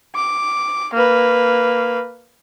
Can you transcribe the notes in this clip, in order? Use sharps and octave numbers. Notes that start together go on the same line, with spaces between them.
D6
A#3 B4